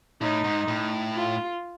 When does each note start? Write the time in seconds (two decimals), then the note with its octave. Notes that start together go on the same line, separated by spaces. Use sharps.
0.21 A2 D#4
0.44 G#2
0.68 A2
1.15 F4